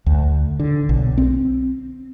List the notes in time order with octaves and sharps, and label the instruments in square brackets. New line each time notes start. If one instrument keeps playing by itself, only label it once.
[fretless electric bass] D2
D3
B1
C4